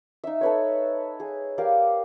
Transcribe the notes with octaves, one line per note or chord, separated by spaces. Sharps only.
D#4 E5
A4 B4 C#5
G#4
G4 A#4 D5 F5